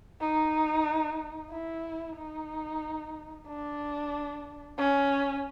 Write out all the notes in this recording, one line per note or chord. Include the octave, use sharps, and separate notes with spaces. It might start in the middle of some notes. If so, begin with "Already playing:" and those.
D#4
E4
D#4
D4
C#4